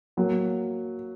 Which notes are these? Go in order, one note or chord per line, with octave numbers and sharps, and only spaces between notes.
F#3 A#3